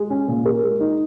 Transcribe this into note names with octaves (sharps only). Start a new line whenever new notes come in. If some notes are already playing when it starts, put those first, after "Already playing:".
Already playing: G#3
C#4
A#2
A#4
G#3
D#4